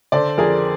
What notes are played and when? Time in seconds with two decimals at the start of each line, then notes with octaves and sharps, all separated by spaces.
0.12 D3 C5 D5
0.38 F2 G#4 A#4